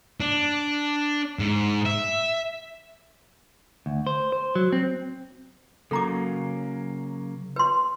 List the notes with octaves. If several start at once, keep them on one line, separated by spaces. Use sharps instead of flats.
D4
G#2
E5
D2
C5
C5
F#3
C4
C#3 F#3 A#3 A4 A#5 D6
B4 C6